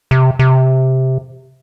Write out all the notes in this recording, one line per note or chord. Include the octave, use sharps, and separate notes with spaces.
C3
C3